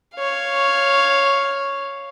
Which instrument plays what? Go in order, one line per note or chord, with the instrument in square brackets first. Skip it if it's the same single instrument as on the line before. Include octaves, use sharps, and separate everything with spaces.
[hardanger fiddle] C#5 F5